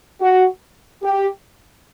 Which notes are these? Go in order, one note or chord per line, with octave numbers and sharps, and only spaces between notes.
F#4
G4